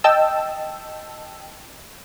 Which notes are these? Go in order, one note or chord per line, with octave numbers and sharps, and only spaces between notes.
D#5 G5 A5 E6